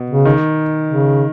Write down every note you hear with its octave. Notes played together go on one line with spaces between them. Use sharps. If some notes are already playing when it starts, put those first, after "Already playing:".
Already playing: B2
C#3
D#3
C#3